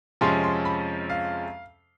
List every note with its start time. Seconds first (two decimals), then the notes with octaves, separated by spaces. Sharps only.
0.21 F2 C3 F3 G#3 C#4 C6
0.44 C6
0.65 B5
1.10 F5